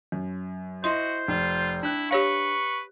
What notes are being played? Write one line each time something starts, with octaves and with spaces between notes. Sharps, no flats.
F#2
E4 F#4 C5 D#5 C6
F1 F4
D4 E4 G5 F#6
G4 B4 C#5 F5 C#6